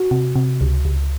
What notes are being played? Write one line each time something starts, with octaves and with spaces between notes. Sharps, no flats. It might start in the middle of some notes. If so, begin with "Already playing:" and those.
Already playing: F#4
C3
C3
C#2
C#2